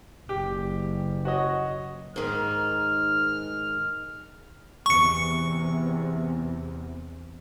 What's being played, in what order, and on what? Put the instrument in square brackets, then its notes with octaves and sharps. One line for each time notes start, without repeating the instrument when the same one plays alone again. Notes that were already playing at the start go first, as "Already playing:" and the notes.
[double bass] F#1 [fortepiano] G4
[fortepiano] F#4 C#5 D#5
[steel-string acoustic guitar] G#2 D#3 [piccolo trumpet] F6
[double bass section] E2 C3 [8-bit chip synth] C#6 C#7